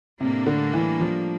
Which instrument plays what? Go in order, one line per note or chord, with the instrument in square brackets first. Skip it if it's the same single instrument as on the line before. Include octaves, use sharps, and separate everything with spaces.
[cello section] A2 G3 A#3 D4 [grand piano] C3
[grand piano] D3
E3
F3